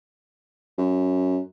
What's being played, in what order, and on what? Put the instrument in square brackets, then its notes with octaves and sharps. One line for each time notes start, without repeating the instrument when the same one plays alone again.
[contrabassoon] F#2